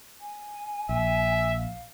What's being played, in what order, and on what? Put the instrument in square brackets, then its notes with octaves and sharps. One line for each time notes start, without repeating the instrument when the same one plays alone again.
[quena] G#5
[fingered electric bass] A#1 [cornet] E5
[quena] F5